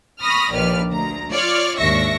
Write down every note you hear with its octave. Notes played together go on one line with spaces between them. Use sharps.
B5 C#6 D#6 F6 A#6
A#1 D#2 B4 D5 F6
D2 A#5
F4 C#5 D5 F6
D#2 G#2 D4 E5 C#6 A#6